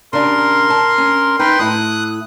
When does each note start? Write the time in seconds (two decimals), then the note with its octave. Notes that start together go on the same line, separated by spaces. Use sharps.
0.13 C#3 D4 G4 A#4 C6
0.70 A5
0.98 C#4
1.39 D#4 B4 G5 C6
1.59 A2 E4 D#6 F#6